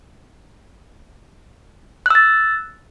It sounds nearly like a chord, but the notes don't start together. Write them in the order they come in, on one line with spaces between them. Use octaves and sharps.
F#6 E6 A6